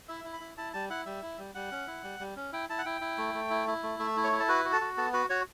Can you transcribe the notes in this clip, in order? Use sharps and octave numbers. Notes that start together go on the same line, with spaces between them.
E4 E5
E4
B5
E4
E4 A5
G3 A5
E4 F#5
G3 E5
E4
G3
G3 F#5
C#4
E4
G3
G3
C#4
E4 G5
E4 A5
F#5
E4 G5
E4
A3
A3
E4
E4
A3
A3 E5
E4
C#5
E4
A4
F#4 B4
F#4
A4
F#4
B3 A4
F#4 B4
F#4 C#5